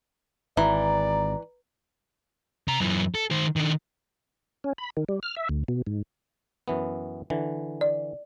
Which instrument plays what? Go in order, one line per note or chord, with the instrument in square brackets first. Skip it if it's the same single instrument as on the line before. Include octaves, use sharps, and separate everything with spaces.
[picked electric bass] G#1 [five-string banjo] E3 [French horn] D5 [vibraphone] A#5
[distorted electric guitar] C3 A#5
F#2 E3
A4
D#3 C5
D#3 D4
[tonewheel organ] C#4
B5
D#3
G3
F6
E5
D2
B2
G#2
[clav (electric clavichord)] F#2 E3 B3
D3 E3
[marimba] D5